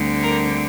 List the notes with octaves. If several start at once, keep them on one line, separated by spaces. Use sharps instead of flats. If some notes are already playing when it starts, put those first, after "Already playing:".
Already playing: D2 D3 G3 C4
A#4